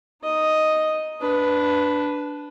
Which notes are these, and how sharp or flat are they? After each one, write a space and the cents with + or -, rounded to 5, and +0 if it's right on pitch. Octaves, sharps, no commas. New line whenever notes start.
D#4 +0 D#5 +0
D4 -5 B4 +5